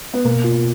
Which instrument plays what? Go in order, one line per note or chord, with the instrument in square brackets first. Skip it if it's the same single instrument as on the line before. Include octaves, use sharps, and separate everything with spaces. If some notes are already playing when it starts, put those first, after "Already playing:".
[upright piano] B3
[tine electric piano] B2 [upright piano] A#3
[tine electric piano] F4